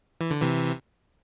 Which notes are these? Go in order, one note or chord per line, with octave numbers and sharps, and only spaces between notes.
E3
D3
C3 E3